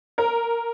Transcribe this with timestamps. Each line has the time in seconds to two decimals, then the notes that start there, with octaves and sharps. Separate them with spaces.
0.18 A#4